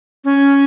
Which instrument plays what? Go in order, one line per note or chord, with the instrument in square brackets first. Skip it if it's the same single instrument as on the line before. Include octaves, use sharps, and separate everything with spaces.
[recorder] C#4